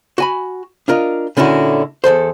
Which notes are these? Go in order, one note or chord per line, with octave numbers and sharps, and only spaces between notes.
F#4 G#5 B5
D4 F4 A#4 D#5
A#2 D3 C#4 E4 F#4
E2 C#3 A4 C5